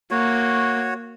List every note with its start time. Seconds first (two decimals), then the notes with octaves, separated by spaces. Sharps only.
0.11 A#3 F#4 C#5